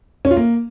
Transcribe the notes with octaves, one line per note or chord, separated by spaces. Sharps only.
C#4
F4
A#3